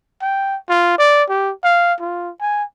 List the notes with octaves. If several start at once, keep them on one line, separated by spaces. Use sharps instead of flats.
G5
F4
D5
G4
F5
F4
G#5